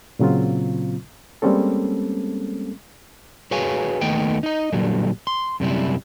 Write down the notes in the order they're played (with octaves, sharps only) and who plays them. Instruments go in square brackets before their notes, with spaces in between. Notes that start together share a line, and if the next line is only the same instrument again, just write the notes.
[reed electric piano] A#2 C#3 F#3 C4 F4
G3 G#3 A#3 C4 C#4 A4
[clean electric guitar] F#4 G#4 B4 C#5 F5 G#5
D#2 D#3 A3 B3 D#5 G5
D#4 D#5
A#2 D3 F#3 G3
C6
F#2 C3 G3 E4